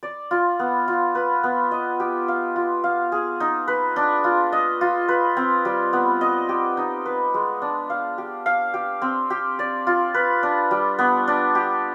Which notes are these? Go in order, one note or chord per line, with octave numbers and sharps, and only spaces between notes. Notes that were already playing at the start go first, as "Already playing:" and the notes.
D5
F4
B3
F4
B4
B3
D#5
G4
F5
F4
F5
G#4
D#4
B4
D4
F4
D#5
F4
B4
C4
G3
B3
D#5
G4
D#4
B4
G#3
D4
F5
G4
F5
G4
C4
G4
D5
F4
B4
D4
G3
B3
D4
G4